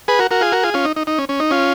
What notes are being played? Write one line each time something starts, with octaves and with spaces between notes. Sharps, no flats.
G#4 B4
F#4 A#4
F#4 A#4
F4 G#4
F#4 A#4
F4 G#4
C#4 F4
D#4
D#4
D#4
C#4
C#4
D#4
C#4 F4